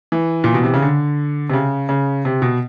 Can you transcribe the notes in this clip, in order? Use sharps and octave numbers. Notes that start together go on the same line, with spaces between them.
E3
A#2
B2
C3
C#3
D3
C3
C#3
C#3
C3
B2